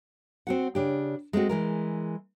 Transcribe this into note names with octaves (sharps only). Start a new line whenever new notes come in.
C4 F#4 F#5
C#3 D4 G4
G#3 A3 C4 F#4
E3 G#3 A#4